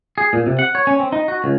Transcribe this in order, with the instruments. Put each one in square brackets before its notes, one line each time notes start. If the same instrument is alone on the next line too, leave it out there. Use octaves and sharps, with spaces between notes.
[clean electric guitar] G#4
A#2
C3
F#5
C#5
C#4
C4
D#4
F#4
C#2